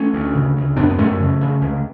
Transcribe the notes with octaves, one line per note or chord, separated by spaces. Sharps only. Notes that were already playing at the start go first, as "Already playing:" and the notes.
Already playing: A3 C#4
D2
C#3
D2
F#2 B3 D4
B3
F#2 A3 C#4
C#3
C#3
C#2